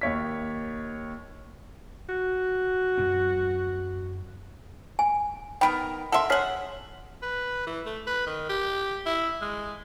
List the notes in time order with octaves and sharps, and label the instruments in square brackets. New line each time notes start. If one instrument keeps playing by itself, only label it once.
[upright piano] D#2 C#5 B6
[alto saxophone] F#4
[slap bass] F#2 C4
[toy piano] G#5
[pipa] D#3 B3 A#4 [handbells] G5 B5 D7
[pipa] A4 A#4 E5 [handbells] F#5 C6
[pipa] G#4 F#5 [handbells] C#5 F6 B6
[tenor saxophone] B4
E3
A3
B4
D#3
G4
E4
G#3